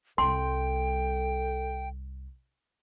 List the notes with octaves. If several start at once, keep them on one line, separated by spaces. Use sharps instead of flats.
C2 G3 A4 G5 C6